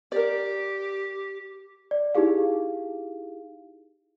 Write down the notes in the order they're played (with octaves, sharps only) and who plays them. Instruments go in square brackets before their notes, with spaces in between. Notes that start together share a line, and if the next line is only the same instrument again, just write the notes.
[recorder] G4 [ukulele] A#4 D5
[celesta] D5
D#4 E4 G4 G#4 F5